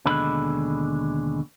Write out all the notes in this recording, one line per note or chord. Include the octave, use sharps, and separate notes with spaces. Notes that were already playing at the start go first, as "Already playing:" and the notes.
D#2 B2 D3 G#3 B5